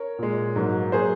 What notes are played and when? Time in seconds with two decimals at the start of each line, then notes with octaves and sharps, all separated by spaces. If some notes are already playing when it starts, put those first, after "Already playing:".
Already playing: A#4 C#5
0.19 A#2 G#3
0.56 G#2 F#3 A#3
0.92 F#3 A#3 G#4 C5